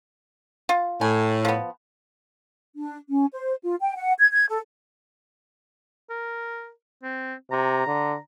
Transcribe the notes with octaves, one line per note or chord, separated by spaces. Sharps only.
F4
A2 G#5
F3 B3
D4
C#4
C5
F4
G5
F#5
G#6
G#6
A4
A#4
C4
C3 A#5
D3